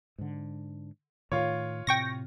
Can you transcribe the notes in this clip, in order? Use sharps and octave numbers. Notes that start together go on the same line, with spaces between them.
G#2 D3
A2 D#3 F4 C#5
A2 C3 C4 G5 C#6 A#6